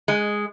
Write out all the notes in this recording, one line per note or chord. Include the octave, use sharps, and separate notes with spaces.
G#3